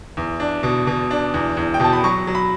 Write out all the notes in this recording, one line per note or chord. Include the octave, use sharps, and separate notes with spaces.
E2
D4
B2
B2
D4
E2
E2
G5
B2 A5
B5
F#3 C#6
F#3
B5